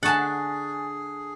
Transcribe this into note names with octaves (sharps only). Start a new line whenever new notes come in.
D3 D4 G#4 F#5 G#5 A5 C#6 A6